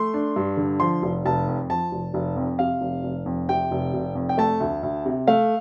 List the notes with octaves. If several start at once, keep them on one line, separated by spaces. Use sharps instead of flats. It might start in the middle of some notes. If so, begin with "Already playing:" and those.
Already playing: A3 C6
D4
G2
D3
F3 C6
F1
F1 A5
F2
F3 A5
F1
F1
F2
C3 F5
F1
F1
F2
C3 G5
F1
F1
F2
G5
A3 A5
D2
D2
C3
A3 F5